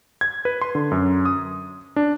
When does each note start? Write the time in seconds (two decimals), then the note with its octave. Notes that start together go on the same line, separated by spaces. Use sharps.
0.21 G#6
0.45 B4
0.62 C6
0.75 D3
0.91 F#2
1.25 D#6
1.96 D4